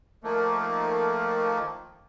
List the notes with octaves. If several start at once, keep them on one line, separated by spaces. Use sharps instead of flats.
D#3 F3 A3 A#3